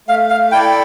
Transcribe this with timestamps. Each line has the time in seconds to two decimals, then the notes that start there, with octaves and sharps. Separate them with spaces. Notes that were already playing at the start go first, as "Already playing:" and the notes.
0.08 A3 F5
0.30 F5
0.52 E4 A4 D5 G5